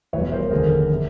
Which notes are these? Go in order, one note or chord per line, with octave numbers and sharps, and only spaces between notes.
F1 E2 B2 G3 B4 C#5
A#4 C5
F1 D#2 D3 G#4 A#4
C3